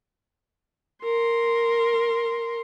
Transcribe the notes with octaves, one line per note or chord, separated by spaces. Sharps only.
A#4 C6